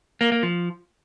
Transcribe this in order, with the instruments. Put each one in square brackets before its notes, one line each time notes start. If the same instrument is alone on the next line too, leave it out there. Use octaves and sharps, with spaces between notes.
[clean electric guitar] A#3
A#3
F3